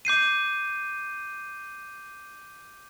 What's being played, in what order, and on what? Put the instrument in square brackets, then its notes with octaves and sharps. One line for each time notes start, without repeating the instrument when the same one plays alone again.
[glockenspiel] D6 G6 C7 D#7